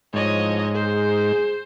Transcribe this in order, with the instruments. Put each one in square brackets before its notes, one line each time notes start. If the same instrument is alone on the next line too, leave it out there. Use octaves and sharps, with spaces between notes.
[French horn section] D2 E3 F3 [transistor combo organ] G#2 [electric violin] C#5 D#5
[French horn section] G#4 [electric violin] C5